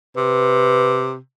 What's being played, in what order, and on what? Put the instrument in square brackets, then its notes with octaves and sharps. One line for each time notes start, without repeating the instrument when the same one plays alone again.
[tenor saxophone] C3 [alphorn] B4